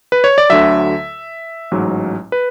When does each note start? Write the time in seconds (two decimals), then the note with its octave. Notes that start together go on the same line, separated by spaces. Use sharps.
0.12 B4
0.24 C#5
0.38 D5
0.49 D2 D3 F#3 E5
1.72 A1 G#2 F#3
2.32 B4